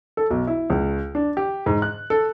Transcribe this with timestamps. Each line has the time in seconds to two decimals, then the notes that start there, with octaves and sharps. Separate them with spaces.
0.17 A4
0.31 B1
0.47 E4
0.70 C#2
1.15 D4
1.37 G4
1.66 G#2
1.82 F#6
2.10 A4